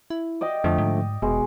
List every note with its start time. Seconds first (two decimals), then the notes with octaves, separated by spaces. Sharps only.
0.10 E4
0.41 D5 D#5 G5
0.64 F2 D3 F3 A3
0.78 G#2
1.22 F1 B2 G#3